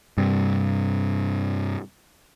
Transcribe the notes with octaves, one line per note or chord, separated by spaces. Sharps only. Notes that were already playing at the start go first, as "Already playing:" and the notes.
G2 C3